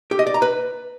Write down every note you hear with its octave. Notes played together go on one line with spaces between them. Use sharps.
G4
D#5
D5
A#5
B4